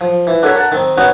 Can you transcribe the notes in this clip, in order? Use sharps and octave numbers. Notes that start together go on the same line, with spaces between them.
F3
E3
D4 F#4 A4 A#4 C#5 B5
A#4 F#5 A5 A#5
D#3 C4
B3 C#4 D#4 F#4